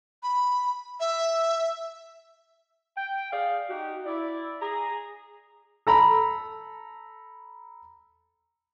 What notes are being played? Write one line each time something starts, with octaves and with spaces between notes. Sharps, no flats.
B5
E5
G5
G#4 D5 F5
D#4 F#4 G4
E4 D5
G#4 A#5
A4 A#5 B5